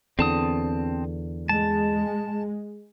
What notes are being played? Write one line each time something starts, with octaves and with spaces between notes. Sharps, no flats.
E2 D3 C4 A5 D#6
G#3 A5